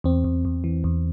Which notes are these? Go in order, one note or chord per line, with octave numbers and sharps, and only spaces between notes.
E2 C4
E2
E2
E3
E2